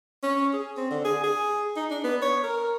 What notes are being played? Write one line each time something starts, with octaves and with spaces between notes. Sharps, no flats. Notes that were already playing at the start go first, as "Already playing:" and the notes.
C#4
G#4
C4
D3
G#4
G#4
D#4
D4
B3
C#5
A#4